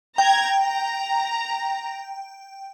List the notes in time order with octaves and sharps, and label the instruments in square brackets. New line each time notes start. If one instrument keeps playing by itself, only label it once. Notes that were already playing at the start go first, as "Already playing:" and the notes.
[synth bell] G5 [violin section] A#5 G#6
[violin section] A#5